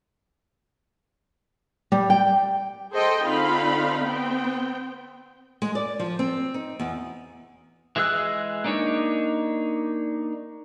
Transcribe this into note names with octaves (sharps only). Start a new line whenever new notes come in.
G3
G5
G#4 A4 C5 D#5 G5
D3 C4 D#4 F4 F5 B5
B3 C4 G5
G#3
D5
F3
C4
D#4
E2
E3 G#3 G#4 E6 F#6
A#3 D4 D#4 C#5